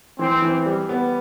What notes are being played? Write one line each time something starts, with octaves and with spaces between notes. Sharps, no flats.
E3 C4
E3
G3
B3